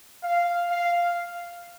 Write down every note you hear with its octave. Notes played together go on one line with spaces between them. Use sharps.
F5
F5